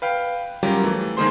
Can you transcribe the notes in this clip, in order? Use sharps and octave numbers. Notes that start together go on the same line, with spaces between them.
B4 F5 G5
F#3 G3 C#4 F4 G4 A#4
E3 A3
D#3 G#3 A#3 G#4 C5 C6